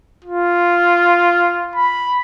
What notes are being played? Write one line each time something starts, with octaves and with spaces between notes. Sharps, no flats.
F4
B5